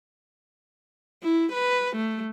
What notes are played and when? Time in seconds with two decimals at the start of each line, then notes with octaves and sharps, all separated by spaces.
1.23 E4
1.52 B4
1.96 A3